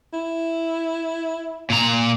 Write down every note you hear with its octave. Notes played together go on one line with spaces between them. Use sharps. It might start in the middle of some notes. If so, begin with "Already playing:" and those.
E4
A#2 A#5